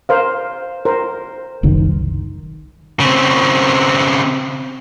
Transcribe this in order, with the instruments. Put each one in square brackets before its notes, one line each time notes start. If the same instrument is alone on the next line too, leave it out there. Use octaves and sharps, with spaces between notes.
[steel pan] A#4 C5 F5
A#4 C5
[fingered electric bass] F#1 C2 D#3
[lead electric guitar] C#3 C4